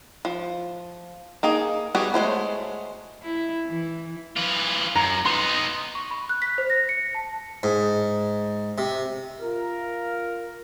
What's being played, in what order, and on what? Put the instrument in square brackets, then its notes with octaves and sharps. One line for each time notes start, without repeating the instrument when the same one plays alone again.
[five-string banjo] F3
A#3 D#4 G#4
G3 B3 F#4 G#4
G#3 A3 C5 C#5
[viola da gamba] E4
E3
[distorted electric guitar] E3 F4
[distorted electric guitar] F#2 [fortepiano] A#5
[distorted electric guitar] B3 D#4 [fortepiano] C6
[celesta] C#6
B5
F#6
B6
C5
A#6
C#7
A5
[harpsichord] G#2
C3
[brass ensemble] F4 A#4